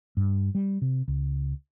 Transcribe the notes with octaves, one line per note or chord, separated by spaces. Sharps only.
G2
G3
C3
C#2